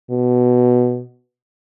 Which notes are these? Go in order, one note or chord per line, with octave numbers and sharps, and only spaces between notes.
B2